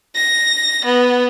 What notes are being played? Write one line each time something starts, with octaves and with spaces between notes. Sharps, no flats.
A#6
B3